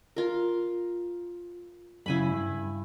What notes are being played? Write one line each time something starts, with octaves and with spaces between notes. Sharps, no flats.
F4 A#4
F#2 C#3 E4 G#5 B5
G2